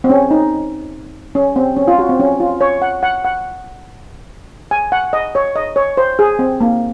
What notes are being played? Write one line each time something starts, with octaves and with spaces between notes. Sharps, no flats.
C4
C#4
D#4
C#4
C4
C#4
F4
F#4
C4
C#4
F4
C#5
F#5
F#5
F#5
G#5
F#5
D#5
C#5
D#5
C#5
C5
G#4
C4
A#3